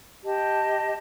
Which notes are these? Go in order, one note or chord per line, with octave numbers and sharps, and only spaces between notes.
G4 D#5 A5